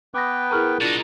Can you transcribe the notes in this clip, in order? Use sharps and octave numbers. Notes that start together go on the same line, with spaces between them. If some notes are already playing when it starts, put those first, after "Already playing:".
B3 B4 G5 D6 D#6 A#6
E4 G#4 A#4 A#5 C#6 F6
B2 D4 D#4 F4 A6